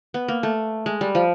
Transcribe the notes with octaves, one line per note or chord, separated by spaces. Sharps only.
B3
A#3
A3
G#3
G3
F3